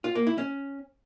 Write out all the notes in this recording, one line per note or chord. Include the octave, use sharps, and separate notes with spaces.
F4
A#3
E4
C#4